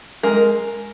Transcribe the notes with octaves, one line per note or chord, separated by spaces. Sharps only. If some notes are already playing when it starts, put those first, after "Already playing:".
G#3 A#4